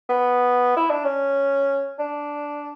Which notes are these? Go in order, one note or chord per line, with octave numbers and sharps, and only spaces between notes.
B3
E4
D4
C#4
D4